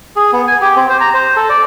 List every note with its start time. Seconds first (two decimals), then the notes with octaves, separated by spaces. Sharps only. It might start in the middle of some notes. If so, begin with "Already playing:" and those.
0.16 G#4
0.33 B3
0.48 G#5
0.61 G4
0.77 C4
0.89 C5
1.01 A#5
1.14 C5
1.36 A4
1.49 D5